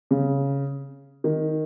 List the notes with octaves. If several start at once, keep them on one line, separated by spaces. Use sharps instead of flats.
C#3
D#3